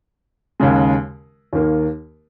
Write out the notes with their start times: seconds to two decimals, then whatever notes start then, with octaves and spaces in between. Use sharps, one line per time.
0.60 D#2 C#3 G#3
1.53 D#2 D#3 A#3